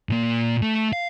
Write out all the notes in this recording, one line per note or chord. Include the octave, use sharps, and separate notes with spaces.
A#2 A#3
A3
F5